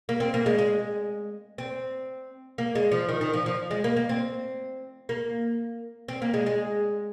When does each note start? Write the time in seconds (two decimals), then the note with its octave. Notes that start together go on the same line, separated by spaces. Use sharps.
0.09 A#3
0.20 C4
0.34 A#3
0.46 G#3
0.58 G#3
1.58 C4
2.58 A#3
2.75 G#3
2.92 F3
3.09 D#3
3.21 D#3
3.34 F3
3.46 F3
3.71 G#3
3.84 A#3
3.96 A#3
4.09 C4
5.09 A#3
6.08 C4
6.22 A#3
6.34 G#3
6.46 G#3